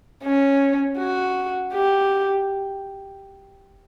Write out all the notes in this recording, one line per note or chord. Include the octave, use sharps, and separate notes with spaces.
C#4
F#4
G4